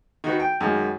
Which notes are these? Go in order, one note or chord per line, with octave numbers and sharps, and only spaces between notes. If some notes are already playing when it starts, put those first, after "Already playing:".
D#3 F#4 B4
G5
F#2 D#3 G#3